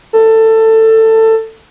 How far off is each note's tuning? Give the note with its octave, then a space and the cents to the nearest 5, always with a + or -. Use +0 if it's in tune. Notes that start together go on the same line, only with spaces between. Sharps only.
A4 +20